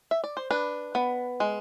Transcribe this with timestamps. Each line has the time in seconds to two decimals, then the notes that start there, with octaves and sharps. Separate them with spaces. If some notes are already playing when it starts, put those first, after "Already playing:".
0.11 E5
0.24 D5
0.37 C5
0.51 D4 B4
0.95 B3
1.40 G#3